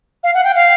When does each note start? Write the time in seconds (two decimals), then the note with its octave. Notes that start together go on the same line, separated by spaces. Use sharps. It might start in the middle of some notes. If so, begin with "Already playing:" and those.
0.24 F5
0.34 F#5
0.44 G5
0.55 F5